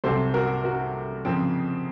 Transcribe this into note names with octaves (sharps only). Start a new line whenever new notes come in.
C2 C3 F#3 C4 A4 C5
F#4 A#4
F#4 A#4
F2 C#3 F3 C4